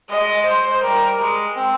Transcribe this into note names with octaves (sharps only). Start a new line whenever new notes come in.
G#3 D#5
C5
G3 A#4
G#3
C4